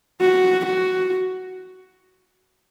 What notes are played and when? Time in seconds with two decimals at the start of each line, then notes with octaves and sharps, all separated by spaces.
0.21 F#4
0.67 F#4